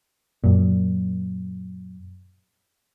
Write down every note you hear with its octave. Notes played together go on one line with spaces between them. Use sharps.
F#2 A#2